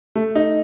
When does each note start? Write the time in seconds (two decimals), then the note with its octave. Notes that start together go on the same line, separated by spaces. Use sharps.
0.16 A3
0.35 D#4